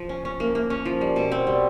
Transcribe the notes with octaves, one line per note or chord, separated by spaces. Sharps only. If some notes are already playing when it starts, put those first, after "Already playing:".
Already playing: F3
C#4
C#4
A#3
A#3
C#4
F3
G3
B2
C4
G3